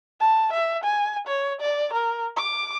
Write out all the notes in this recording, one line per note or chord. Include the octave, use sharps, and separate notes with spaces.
A5
E5
G#5
C#5
D5
A#4
D6